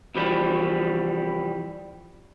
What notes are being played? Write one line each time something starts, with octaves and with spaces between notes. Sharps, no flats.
C2 E3 F3 G3